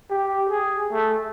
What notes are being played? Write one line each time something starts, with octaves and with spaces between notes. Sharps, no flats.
G4
G#4
A3